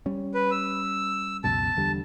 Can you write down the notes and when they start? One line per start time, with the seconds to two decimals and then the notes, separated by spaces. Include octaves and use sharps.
0.06 G3 C#4
0.34 B4
0.51 E6
1.44 C#2 F#2 B2 A5
1.77 E2 D3 G3